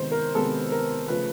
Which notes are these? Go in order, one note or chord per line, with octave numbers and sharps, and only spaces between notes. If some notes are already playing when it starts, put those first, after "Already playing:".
Already playing: C3 D#3 G#3 B3 C5
A#4
C3 D#3 G#3 B3 A4
A#4
C#3 F3 A3 B4